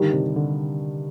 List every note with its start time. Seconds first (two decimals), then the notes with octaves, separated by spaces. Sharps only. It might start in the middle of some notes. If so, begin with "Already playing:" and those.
Already playing: G2 D3 D#3 G3
0.13 C3
0.36 D3